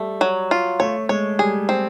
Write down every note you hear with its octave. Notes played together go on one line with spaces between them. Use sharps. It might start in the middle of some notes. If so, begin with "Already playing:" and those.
Already playing: G3 A3
F#3
F4
A3 C#5
G#3 C#5
G3 G#4
C4